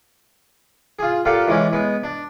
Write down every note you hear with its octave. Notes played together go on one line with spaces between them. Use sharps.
F4 G#4
A#2 G4 A4 F5 F#5
E3 G#3 C#4 D5
G#3 B3
D4